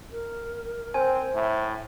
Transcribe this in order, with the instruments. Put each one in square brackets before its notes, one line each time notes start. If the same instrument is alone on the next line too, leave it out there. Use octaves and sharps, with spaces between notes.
[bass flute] A#4
[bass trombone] C4 [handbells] C5 G#5
[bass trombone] A2 [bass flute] E5